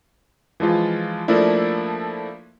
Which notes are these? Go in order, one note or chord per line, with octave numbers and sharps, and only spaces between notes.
E3 F3 G#3 F4
F3 A3 A#3 D4 E4